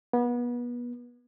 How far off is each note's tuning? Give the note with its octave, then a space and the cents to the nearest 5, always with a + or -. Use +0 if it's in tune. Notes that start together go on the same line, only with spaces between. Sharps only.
B3 -30